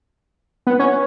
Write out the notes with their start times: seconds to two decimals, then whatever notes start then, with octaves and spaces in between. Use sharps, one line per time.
0.67 B3
0.79 C#4